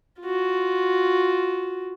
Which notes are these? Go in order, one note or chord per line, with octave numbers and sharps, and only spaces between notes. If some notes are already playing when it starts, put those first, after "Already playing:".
F4 F#4